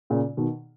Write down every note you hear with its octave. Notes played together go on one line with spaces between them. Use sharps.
A#2 C#3
B2 D#3